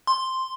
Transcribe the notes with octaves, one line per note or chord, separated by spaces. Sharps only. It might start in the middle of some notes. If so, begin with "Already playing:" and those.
C6